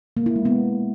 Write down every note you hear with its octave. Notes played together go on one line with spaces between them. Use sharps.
A#3
E4
G#3
B3